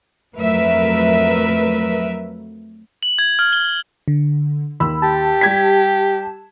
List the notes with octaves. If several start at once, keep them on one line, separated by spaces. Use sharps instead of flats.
F2 F#3 A3 A#4 B4 E5
F#7
G#6
F6
G7
D3
D#2 B5 E6
G4 A5
G3 G#6 B6